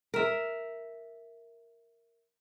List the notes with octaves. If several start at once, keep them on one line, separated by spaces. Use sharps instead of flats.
A#4 E5